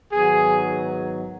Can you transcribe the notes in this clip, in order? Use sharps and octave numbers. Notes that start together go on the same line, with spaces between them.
G#2 D#3 F#3 B3 D#4 G#4